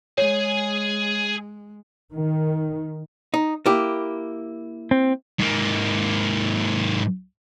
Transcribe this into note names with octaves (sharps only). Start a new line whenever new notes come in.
G#3 G#4 C#5 G#5
D#3
D#4
A#3 E4 G4
C4
G#2 A#3